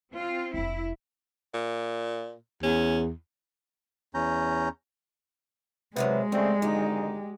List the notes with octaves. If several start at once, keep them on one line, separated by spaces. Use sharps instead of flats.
C4 F4
F1 D4 E4
A#2
E2 C#4
E2 C#4 A#5 G6
C3 D#3 F#3 G#3 B3
C#3 G3 A3 C4
G#1 D3 D#4 G4